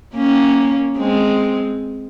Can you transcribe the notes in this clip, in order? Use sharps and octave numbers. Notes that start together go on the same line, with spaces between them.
A#3 C#4
G#3 C4